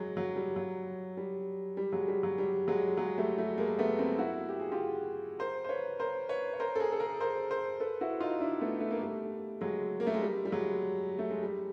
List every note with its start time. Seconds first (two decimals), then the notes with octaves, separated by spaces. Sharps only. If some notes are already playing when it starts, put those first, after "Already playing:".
Already playing: F#3 G#3
0.17 F#3
0.36 G3
0.56 F#3
1.17 G3
1.77 G3
1.92 F#3 G#3
2.08 G3
2.23 F#3
2.38 G3
2.68 F#3 G#3
2.97 F#3 G#3
3.18 G3 A3
3.38 G3 A3
3.58 G#3 A#3
3.78 A3 B3
3.98 A#3 C4
4.18 E4 F#4
4.49 G4
4.59 G#4
4.72 F4 G4
5.39 A#4 C5
5.65 C5
5.69 B4 C#5
5.99 A#4 C5
6.29 B4 C#5
6.54 C#5
6.60 A#4 C5
6.75 A4
6.79 G#4 A#4
6.92 A4
7.00 G#4 A#4
7.20 A#4 C5
7.50 A#4 C5
7.80 A4 B4
8.01 E4 F#4
8.20 D#4 F4
8.40 D4 E4
8.61 A3 B3
8.80 A3
8.91 A#3
9.01 G3 A3
9.61 F#3 G#3
10.00 A#3
10.07 A3
10.14 G#3
10.21 G3
10.45 G3
10.52 F#3 G#3
11.19 A3
11.31 G#3
11.43 G3